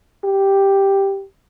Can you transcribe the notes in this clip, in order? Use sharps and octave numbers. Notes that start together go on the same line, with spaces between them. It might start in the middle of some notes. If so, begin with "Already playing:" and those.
G4